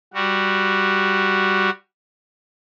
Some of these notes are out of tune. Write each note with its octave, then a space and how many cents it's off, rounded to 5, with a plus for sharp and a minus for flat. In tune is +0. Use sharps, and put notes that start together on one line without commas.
G3 +0 F#4 +0